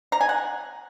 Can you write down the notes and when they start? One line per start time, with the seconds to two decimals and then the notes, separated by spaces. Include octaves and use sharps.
0.12 A#5
0.21 G#5
0.29 F#5